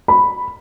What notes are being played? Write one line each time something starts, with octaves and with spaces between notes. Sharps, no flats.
B5